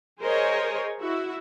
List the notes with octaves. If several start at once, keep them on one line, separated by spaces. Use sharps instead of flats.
G#4 A#4 C5 C#5 D#5
E4 F#4 E5